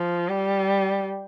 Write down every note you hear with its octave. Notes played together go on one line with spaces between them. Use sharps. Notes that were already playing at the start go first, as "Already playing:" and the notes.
Already playing: F3
G3